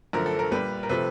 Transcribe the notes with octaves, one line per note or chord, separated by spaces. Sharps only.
F#2 D3 F3 A3 A#4
A4
A#4
A#2 G3 B4
A#4
C3 F3 A3 B4